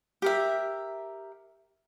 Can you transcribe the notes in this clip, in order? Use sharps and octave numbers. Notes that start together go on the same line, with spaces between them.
G4 A#4 E5